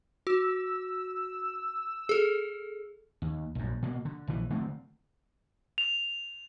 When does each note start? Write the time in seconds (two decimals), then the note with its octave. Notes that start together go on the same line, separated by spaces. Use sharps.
0.27 F#4 E6
2.09 G#4 A4
3.22 D#2
3.55 A#1 F#2
3.83 B2 A#3
4.05 D3
4.27 A#1 E3
4.50 D3 A3 C4
5.78 F7